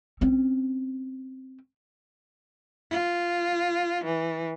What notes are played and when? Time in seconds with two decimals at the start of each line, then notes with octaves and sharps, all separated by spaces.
0.21 C4 C#4
2.91 F4
4.05 E3